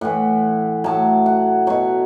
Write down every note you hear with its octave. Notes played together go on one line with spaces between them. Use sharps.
A2 E3 F#5
A2 F#3 A5
F#5
B2 F#3 C#5